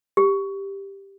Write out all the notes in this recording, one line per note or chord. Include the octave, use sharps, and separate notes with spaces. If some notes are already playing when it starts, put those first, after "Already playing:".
G4